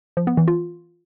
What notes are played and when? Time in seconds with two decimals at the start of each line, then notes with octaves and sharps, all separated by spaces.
0.17 F3
0.27 B3
0.37 E3
0.48 F4